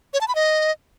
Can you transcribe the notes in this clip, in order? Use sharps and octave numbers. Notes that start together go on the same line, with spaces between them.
C#5
A5
B5
D#5